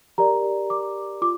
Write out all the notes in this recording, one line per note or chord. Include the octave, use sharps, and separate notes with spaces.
G4 A#4 D5 A#5
D6
F4 D6